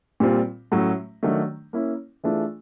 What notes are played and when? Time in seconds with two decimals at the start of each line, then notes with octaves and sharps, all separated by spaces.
0.20 A#2 G3 C4 F4
0.72 A2 F#3 A3 C#4
1.23 D#3 F#3 A3 D4
1.73 A#3 C#4 E4
2.24 E3 A3 D4 F4 G#4